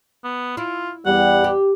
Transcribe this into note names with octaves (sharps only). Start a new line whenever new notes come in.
B3
E4 F4
E2 G3 F#5
G4